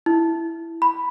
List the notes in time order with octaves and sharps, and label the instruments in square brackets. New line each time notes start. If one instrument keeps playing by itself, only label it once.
[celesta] E4
B5